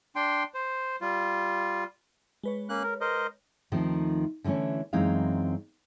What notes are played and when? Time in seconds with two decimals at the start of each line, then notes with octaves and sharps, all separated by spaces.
0.16 D4 G5 C6
0.54 C5
1.01 G3 F4
2.43 G#3 B4 C#5
2.69 A#3 C#4 F#6
2.83 A#4
3.01 A#4 C5 D#5
3.72 D#2 D#3 F3 A3 C4
4.44 D3 E3 G3 A3 C#4
4.93 F#2 E3 G#3 C4 D#4 F5